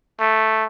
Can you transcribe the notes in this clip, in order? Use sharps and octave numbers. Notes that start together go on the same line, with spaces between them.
A3